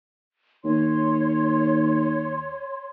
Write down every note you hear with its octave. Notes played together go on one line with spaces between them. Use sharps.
D#2 C#5 C6